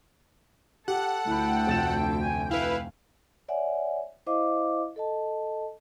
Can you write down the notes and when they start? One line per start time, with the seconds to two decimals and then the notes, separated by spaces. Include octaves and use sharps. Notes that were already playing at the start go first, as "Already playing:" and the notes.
0.88 G4 A4 F#5
1.27 D2 E4 G5 B5
1.67 F1 A6 E7
2.22 G#5
2.51 E4 B4 F5
3.48 C#5 D5 E5 F#5 G#5
4.26 E4 C5 D#5 F5 D6
4.96 A4 D#5 A5